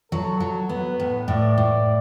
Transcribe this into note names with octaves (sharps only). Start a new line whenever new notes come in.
F#3 A4
F#3
B3 B4
A2
A2 D5
A2